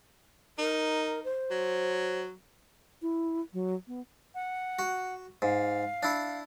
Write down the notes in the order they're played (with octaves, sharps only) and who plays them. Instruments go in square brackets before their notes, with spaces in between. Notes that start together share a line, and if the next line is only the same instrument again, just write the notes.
[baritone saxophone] D#4 [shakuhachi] A#4
[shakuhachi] C5
[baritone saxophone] F#3
[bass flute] E4
F#3
B3
[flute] F#5
[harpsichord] F#4
[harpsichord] G#2 [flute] F5
[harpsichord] D4 E4